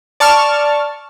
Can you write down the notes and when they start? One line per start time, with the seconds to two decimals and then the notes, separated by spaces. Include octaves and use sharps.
0.20 D5 A5 C#6 F6